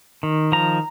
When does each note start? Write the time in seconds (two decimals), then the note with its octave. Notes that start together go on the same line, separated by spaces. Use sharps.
0.23 D#3
0.52 F3 A#5